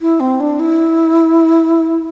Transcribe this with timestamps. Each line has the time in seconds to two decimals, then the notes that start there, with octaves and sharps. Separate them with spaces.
0.01 E4
0.20 C4
0.40 D4
0.60 E4